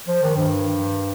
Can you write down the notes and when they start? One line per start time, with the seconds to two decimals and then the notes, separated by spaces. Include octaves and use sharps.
0.08 F3
0.22 D#3
0.37 G2